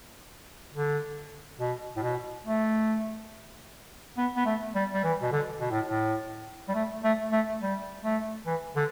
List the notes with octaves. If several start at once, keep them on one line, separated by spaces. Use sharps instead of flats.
D3
B2
A2
B2
A3
B3
B3
A3
G3
G3
E3
B2
D3
B2
A2
A2
G3
A3
A3
A3
G3
A3
E3
D3